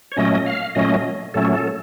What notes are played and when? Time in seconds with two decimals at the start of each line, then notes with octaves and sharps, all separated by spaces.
0.12 C#5
0.16 A#2 F#3 A3 C#4 D#5
0.46 F5
0.75 A#2 F#3 A3 C#4 D#5
1.34 A#2 F#3 A3 C#4 A4
1.54 A4